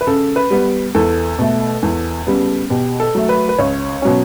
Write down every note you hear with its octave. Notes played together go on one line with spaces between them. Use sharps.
B4
C#3 A4
B4
G3 B3
E2 A4
B2 A3
E2
C#3 G3 B3
B2 G4
A4
F#3 A3
B4
B4
C#2 C#5
B2 F#3 C#4